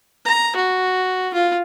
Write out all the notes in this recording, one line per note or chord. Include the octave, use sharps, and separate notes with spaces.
A#5
F#4
F4